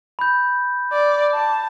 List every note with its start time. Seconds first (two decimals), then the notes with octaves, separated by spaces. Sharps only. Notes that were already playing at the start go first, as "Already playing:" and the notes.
0.19 B5 G6
0.93 D5
1.34 A5